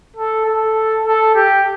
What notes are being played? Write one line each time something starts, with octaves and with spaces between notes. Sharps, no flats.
A4
A4
A4
G4